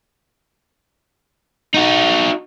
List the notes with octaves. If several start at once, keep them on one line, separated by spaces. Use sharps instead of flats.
D#4 F#4